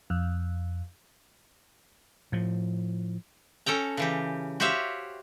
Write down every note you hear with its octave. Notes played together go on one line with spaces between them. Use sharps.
F2
A2 F3
C#4 A4 G5 A#5
C#3 E3 G4
F#4 G4 C5 C#5 E5 F5